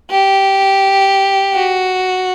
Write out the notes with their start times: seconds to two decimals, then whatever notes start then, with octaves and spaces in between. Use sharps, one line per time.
0.11 G4
1.54 F#4